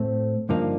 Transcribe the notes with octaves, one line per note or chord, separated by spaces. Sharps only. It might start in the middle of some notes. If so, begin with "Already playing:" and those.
Already playing: A2 A3 C4
G2 D3 F3 A#3 D#4